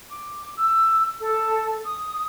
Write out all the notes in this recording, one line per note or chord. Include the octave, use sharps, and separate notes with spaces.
D6
E6
A4
D#6